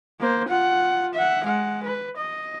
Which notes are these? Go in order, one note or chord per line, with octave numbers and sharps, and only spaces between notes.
A#3 C5
F4 F#5
E5 F#5
G#3 F#5
B4
D#5